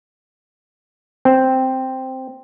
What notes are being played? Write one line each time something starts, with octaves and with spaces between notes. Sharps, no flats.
C4